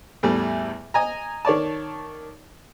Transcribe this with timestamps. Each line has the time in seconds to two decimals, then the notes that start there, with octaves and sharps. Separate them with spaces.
0.23 E2 A2 G3
0.94 D#5 G#5 A#5
1.45 D#3 C#5 D5 A5